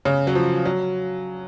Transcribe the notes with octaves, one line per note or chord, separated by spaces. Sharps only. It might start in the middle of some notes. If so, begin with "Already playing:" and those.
C#3
F#3
F3
F#3